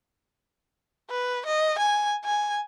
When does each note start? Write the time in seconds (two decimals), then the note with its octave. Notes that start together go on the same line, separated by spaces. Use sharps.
1.10 B4
1.46 D#5
1.79 G#5
2.25 G#5